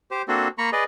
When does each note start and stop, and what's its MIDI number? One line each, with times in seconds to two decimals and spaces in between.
0.11 0.22 67
0.11 0.22 72
0.28 0.48 58
0.28 0.48 60
0.28 0.48 62
0.28 0.48 66
0.28 0.48 69
0.58 0.70 58
0.58 0.70 82
0.58 0.70 83
0.58 0.70 85
0.72 0.84 68
0.72 0.84 71
0.72 0.84 74
0.72 0.84 75